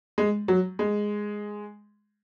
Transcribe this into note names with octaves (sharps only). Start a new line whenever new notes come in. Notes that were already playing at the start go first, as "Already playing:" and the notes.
G#3
F#3
G#3